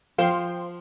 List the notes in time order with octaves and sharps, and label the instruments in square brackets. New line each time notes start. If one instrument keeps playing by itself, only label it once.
[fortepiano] F3 [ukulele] C5 F5 [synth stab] G5 C6